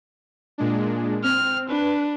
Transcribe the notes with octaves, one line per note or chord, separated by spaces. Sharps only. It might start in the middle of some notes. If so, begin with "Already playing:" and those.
A#2 G#3 D4
C4 F6
D4 B4